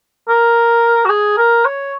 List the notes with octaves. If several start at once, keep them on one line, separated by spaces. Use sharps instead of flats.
A#4
F#4
G#4
A#4
C#5